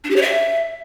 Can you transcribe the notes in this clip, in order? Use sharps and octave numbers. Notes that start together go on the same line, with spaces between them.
D4
G4
C#5
E5